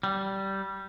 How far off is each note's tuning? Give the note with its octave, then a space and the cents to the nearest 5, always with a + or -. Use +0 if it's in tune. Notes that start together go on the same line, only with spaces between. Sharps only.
G3 -15